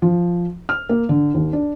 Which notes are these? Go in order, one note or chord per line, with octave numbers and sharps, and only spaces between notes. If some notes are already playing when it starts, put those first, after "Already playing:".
F3
F6
A#3
D3
D#2
D4